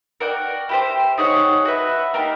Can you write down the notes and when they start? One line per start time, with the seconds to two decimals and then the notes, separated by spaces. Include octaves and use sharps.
0.20 F#4 A#4 D5 G5
0.69 E4 G4 C5
1.18 D#4 G#4 C#5 F#5
1.65 F#4 B4 E5
2.14 A#3 D#4 G4 A#4